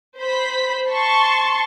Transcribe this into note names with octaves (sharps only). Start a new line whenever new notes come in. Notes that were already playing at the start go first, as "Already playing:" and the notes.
C5 B5 B6
A5 C6 C#6